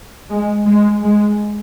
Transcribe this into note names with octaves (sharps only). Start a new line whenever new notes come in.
G#3
G#3
G#3